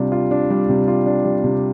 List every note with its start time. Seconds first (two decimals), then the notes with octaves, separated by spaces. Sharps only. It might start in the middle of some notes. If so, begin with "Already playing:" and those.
Already playing: C3 G3 D4 F4
0.12 F4
0.31 D4
0.50 G3
0.69 C3
0.88 F4
1.06 D4
1.25 G3
1.44 C3